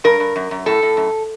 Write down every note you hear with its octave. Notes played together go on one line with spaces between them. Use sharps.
G2 A#4
G2
F#2
F#2
A2 A4
A2
F#2